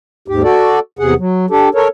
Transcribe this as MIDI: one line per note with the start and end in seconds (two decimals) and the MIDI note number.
0.28 0.43 39
0.28 0.43 44
0.28 0.43 67
0.43 0.79 66
0.43 0.79 69
0.43 0.79 74
0.99 1.14 40
0.99 1.14 48
0.99 1.14 68
0.99 1.14 78
1.18 1.46 54
1.50 1.69 62
1.50 1.69 67
1.50 1.69 69
1.75 1.88 69
1.75 1.88 70
1.75 1.88 73